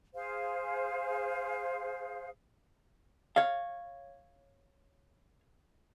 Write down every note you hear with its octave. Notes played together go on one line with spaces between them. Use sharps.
G#4 C5 F5
C#5 F5